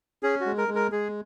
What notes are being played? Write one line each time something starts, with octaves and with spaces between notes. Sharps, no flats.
C#4 G#4
F#4
G#3
A#4
G#3
A#4
G#3 G#4